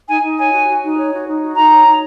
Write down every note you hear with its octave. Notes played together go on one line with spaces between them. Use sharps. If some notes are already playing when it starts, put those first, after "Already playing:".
D#4 G#5
D#4
C#5 G#5
F#4
F#4
D#4
C#5
F#4
D#4
F#4
D#4 A#5
C#5
D#4